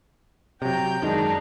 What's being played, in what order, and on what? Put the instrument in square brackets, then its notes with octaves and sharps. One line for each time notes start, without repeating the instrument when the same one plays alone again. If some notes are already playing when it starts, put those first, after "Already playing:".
[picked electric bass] C3 F#3 [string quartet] G5 A#5 G6
[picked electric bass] F#2 D#3 G#3 [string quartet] D4 D#4 A#5